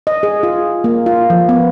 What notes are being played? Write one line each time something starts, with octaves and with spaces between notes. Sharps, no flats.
D#5
G#4
F4
A#3
F4
F3
B3